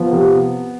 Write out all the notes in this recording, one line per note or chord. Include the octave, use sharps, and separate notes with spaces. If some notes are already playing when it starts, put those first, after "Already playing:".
Already playing: F3 B3
C3